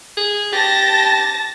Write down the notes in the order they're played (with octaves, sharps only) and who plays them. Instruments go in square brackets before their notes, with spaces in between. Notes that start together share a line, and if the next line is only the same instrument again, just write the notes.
[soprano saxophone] G#4
[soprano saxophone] G4 [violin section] A5 A6 A#6